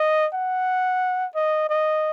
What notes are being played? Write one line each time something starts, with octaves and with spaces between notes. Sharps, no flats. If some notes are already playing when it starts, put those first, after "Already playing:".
Already playing: D#5
F#5
D#5
D#5